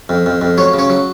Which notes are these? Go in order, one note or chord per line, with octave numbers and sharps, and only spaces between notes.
F2
F2
F2
F#3 C#5
C#3
C#5
F#3